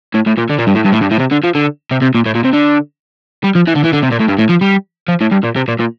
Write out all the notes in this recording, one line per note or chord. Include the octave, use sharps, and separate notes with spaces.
A2
A2
A#2
D3
A#2
G2
A2
G2
A2
G2
A2
C3
D3
F3
D3
C3
C3
A#2
A2
A#2
C3
D3
G3
F3
E3
D3
E3
D3
C3
A#2
A2
G2
A2
F3
G3
F3
A2
G2
A#2
C3
A#2
A#2